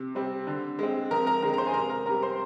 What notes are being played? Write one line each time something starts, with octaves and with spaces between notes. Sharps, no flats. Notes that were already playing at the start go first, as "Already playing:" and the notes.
Already playing: C3
G3 C4
D3
G#3 C4
F2 A#4 A#5
A#4 A#5
D3 G#3 C4 A#4 A#5
A#5
C5 C6
G#5
C3 A#4 A#5
A#4 A#5
G3 C4 A#4 A#5
C5 C6